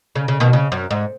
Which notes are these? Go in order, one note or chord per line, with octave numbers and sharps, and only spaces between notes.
C#3
C#3
B2 D#3
C#3
F#2
G#2